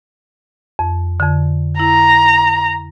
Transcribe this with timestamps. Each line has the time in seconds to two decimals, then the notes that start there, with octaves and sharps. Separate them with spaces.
0.79 F2
1.20 F2 D3
1.79 E4 A#5